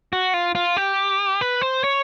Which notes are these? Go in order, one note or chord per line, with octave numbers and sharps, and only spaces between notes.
F#4
F4
F4
G4
B4
C5
C#5